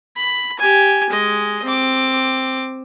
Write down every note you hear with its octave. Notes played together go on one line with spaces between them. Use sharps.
B5
G4 G#5
G#3 D#5
C4 D6